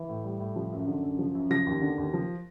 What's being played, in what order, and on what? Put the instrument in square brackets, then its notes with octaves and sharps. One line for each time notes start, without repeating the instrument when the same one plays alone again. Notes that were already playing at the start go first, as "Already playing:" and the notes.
Already playing: [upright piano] E3
A2
G3
A2
F3
F#2
D3
F#2
F3
F#2
F3 A#6
D#2
D3
D#2
F3